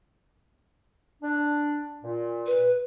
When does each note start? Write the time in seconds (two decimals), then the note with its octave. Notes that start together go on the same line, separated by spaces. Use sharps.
1.22 D4
2.03 A#2
2.47 B4